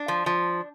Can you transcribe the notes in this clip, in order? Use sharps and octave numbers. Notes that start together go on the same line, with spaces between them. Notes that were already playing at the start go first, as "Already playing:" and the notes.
Already playing: D4
F3
F3